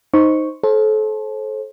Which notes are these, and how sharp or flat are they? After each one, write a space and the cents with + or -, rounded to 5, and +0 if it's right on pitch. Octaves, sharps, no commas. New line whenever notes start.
D#4 +0 C5 +0 C#6 +0
A4 -30 C5 +35